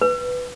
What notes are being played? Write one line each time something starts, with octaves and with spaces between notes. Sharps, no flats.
B4